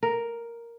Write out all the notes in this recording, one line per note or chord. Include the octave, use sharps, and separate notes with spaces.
A#4